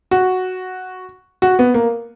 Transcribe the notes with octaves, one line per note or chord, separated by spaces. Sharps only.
F#4
F#4
B3
A#3